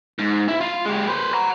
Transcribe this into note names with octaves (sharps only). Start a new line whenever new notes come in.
G#2
E4
F4
G#3 G4
B4 C5
F#5 A#5